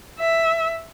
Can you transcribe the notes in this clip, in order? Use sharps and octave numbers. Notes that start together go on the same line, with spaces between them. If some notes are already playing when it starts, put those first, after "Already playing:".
E5